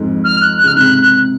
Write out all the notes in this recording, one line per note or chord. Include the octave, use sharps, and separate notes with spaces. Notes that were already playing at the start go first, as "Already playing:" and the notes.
Already playing: F2 G#2
F6
F#6
F#6
C#3 F6
G#2 C3 F#6
F#6